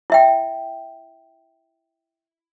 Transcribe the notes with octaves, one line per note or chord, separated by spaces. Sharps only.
E4 E5 G5